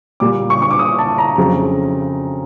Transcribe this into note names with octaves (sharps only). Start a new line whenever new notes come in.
A#2 G3 D6
C#6
C#6
D6
D#6
A5
A#5
F2 C#3 F#3